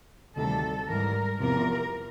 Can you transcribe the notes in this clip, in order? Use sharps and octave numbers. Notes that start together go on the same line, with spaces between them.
D2 C3 D#3 G3 A4
G#2 E3 G3 A#4
E2 C3 F3 A#4